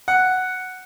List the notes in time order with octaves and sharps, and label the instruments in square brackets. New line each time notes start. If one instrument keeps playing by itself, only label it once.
[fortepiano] F#5